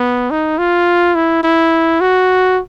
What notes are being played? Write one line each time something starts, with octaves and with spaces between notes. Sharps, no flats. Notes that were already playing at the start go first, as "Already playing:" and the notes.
Already playing: B3
D#4
F4
E4
E4
F#4